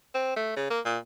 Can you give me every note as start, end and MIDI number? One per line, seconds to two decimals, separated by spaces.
0.15 0.35 60
0.36 0.56 57
0.57 0.70 49
0.70 0.80 58
0.85 0.98 46